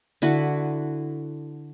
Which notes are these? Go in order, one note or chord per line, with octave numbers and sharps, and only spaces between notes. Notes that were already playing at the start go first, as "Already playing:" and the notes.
D3 E4 F#4 B4